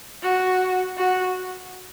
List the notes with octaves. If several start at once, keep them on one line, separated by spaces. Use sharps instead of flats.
F#4
F#4